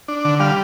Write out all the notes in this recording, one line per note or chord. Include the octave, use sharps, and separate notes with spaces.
D4
D3
G3 F5